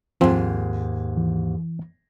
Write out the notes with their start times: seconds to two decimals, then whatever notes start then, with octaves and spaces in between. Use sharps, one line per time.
0.21 D#2 G#2 F3 C4
1.17 E3